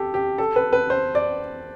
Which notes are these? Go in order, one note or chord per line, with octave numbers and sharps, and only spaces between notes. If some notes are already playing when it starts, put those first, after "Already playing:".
Already playing: G4 A4
G4
A4
B4
B4
C5
D5